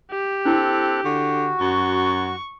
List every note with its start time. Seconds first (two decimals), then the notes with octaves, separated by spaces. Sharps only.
0.11 G4
0.45 C4 D4 E4 A4 F#6
1.05 D3 F#4
1.60 F#2 C#6